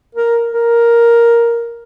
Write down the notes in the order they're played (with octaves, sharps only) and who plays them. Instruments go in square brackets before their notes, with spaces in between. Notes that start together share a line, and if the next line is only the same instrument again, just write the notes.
[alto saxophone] A#4
A#4